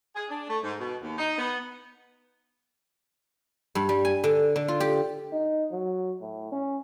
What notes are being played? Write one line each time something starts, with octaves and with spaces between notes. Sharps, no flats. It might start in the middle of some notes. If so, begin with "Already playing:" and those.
G#4
D4
A3
G#2
B2
D#2
D#4
B3
G2
G3
G#5
D3
D3
F4
G4
D#4
F#3
A2
C#4